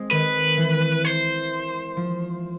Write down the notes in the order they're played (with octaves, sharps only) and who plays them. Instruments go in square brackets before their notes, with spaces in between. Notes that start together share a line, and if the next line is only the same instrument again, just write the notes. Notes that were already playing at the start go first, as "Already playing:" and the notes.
Already playing: [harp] G#3 C4
[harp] D#3 [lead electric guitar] B4
[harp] E3
[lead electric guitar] C5
[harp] F3